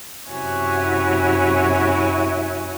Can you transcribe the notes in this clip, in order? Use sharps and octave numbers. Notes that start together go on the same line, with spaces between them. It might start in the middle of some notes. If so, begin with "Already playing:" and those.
F#2 C3 E4 F#4 C#5 G#5